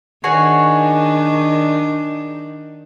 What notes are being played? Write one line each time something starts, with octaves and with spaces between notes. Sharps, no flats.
D#3 D4 F#4 G#4 C#5